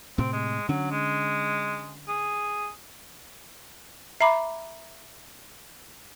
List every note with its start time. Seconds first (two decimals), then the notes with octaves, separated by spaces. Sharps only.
0.18 A2 C3 C4
0.33 G#3
0.69 D3 F#3 C#4
0.91 G#3
2.08 G#4
4.21 E5 A#5 B5 D6